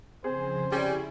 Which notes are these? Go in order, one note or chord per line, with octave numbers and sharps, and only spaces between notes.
F2 C#3 C4 G#4 C5
C3 G3 C#4 E4 G#4